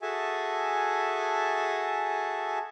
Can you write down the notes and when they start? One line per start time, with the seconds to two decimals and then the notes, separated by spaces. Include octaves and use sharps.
0.02 F#4 G#4 A4 E5 G#5 A5